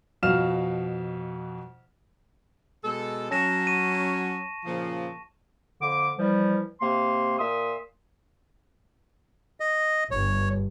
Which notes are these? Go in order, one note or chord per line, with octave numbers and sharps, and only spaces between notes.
F2 B2 F5 F6 E7
B2 G#3 A4
F#3 C#4 A5 A#6 E7
C#6 D#7
A#2 C#3 F3
F2 D3 D6
E3 F3 G3
C3 A#3 C6
A#2 E5 C6 D#6
D#5
G1 C#5